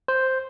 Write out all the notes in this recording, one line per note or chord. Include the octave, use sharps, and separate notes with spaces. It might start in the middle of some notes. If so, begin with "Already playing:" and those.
C5